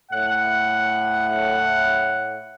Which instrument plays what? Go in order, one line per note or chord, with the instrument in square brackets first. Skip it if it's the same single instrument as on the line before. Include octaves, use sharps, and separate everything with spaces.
[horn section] A2 F#5